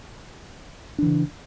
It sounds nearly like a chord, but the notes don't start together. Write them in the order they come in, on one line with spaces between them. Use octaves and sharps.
D4 E3 C#3